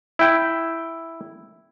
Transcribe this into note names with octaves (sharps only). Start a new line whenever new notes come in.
E4 G5